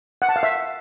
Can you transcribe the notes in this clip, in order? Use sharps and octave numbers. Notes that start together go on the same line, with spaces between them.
F#5
A5
F5
E5